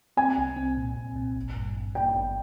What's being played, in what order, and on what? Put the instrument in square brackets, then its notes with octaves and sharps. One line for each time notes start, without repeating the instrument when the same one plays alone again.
[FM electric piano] C4 [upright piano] G#5
[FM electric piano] C2
C4
A#2
C2
A#2
G#1
G2
G#1
[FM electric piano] G#1 [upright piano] G5
[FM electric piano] G#1